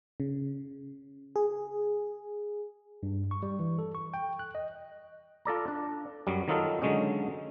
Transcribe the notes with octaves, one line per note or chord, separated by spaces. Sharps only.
C#3
G#4
G2
C#6
G3
E3
A4
C#6
G5
F#6
D#5
F4 A4 D5 A#5
D4
F#2 F#3 G3
D#3 F#3 D#4 F4 A4
D3 F#3 G#3 C#4 D#4